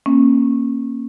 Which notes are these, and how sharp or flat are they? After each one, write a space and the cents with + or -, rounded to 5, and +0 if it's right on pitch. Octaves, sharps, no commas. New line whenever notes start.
A#3 +0 C#4 -25